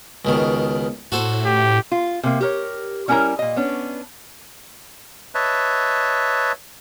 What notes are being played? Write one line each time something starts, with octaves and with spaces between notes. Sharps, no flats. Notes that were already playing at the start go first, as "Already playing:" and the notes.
C#2 B2 D#3
A2 F#4 A4 C5
G4
F4
C3 A#3
G4 A#4 C#5
G3 C#4 D4 E4 A#4 A#5
A#2 D#5
B3 C#4 D4
B4 C#5 D#5 E5 A5